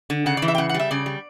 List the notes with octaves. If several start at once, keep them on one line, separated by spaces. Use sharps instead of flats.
D3
C#3 F#5
D5
E3
E5
G5
C#3 F#5
F#5
G3
E5
C#3 D5
G3